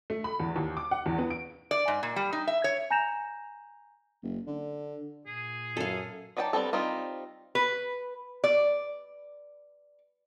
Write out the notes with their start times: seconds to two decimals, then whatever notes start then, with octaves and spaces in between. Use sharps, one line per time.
0.10 A3
0.24 B5
0.39 E2
0.56 D#2
0.77 D6
0.91 F#5
1.06 E2
1.18 B3
1.30 D7
1.71 D5
1.88 G#2
2.03 A#2
2.16 G3
2.33 D#4
2.47 E5
2.64 C#5
2.90 G#5 A#5 G6 A#6 E7 F7
4.23 F#1
4.47 D3
5.26 A#2 G#4
5.77 F#2 A4 F5
6.37 F#3 D#4 D5 G5 A5
6.53 G3 B3 C4 A4
6.73 G3 C4 D#4 F4
7.55 B4
8.44 D5